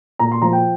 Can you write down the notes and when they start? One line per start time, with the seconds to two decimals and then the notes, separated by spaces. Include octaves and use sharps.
0.19 A#2 A#5
0.32 C6
0.42 F3 A#5
0.53 G5